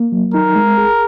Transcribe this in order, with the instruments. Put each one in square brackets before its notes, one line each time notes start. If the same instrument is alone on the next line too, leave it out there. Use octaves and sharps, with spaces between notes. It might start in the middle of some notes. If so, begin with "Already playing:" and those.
Already playing: [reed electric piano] A#3
F#3
[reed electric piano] D#4 [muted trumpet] A#4
[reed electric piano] G#3
G#4